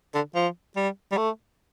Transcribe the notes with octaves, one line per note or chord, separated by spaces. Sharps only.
D3
F3
G3
G3
A3